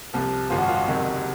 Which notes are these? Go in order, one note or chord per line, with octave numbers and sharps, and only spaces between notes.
C2 C3 F3
G#1 F#2 C#3 F3 F4
F#4
F4
F#4
F#1 F2 C3 D#3 F#3